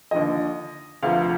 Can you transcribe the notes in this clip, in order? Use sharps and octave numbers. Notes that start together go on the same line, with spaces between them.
D#2 D3 F3 D#5
D2 C3 F3 F5